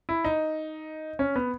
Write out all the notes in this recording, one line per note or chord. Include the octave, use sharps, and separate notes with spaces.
E4
D#4
C#4
B3